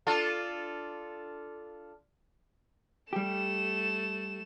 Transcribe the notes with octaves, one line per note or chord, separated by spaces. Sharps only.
D4 F4 A4
G3 A3 G4 E7